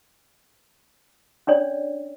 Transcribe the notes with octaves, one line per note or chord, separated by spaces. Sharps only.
C#4 D4 C#5 D5